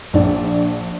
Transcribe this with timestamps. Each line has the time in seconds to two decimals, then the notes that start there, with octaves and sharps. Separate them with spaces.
0.13 A#1 D4